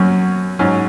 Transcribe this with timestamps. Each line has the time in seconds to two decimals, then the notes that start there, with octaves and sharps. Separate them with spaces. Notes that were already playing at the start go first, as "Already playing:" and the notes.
Already playing: F#2 F#3 C#4
0.59 G#2 F#3 C#4